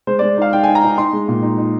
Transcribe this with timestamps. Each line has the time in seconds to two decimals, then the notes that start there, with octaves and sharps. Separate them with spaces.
0.07 G#3 C5
0.19 G#3 D5
0.37 D#4 F5
0.52 D#4 G5
0.63 G#5
0.67 D#4
0.75 A#5
0.83 D#4
0.98 D#4 C6
1.13 G#3
1.28 A#2
1.43 D#4
1.58 D#4